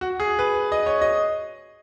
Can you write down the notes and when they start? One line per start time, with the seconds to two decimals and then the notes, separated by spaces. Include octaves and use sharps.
0.01 F#4
0.20 G#4
0.39 B4
0.72 D#5
0.86 C#5
1.01 D#5